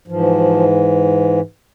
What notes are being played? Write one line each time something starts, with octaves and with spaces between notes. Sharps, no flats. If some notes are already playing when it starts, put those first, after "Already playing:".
G#2 E3 F3